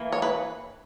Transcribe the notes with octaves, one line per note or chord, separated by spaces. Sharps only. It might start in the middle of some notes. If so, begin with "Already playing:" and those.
Already playing: E3 A#3
C#5
B4